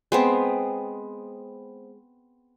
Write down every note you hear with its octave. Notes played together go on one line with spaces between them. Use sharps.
G#3 B3 C4